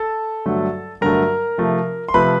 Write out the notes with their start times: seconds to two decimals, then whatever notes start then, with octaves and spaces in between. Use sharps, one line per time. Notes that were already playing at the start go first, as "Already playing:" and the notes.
Already playing: A4 A5
0.46 G2 D3 F#3 A3
1.01 G2 D3 F#3 A3 A#4 A#5
1.58 C3 F3 A3
2.09 C6
2.14 C3 F3 A3 B4 B5